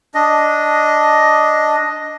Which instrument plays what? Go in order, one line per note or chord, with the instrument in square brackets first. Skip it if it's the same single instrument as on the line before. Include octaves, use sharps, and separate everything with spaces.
[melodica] D4 D#5